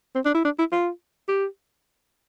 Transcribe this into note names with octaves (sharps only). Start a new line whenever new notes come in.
C4
D4
E4
D4
E4
F4
G4